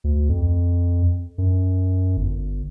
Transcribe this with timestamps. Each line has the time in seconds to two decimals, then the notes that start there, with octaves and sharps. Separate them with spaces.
0.04 D2
0.29 F2
1.38 F#2
2.17 G1